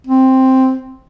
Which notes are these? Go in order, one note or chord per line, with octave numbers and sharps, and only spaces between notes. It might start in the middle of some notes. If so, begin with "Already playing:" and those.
C4